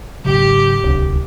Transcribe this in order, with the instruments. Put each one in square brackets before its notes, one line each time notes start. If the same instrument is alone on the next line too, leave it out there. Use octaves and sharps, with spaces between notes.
[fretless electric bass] G#1 C#3 F#3 [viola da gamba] G4
[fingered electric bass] D1 [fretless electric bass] C2 D4